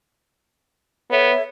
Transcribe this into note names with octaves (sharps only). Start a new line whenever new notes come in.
B3 A4 C#5 E5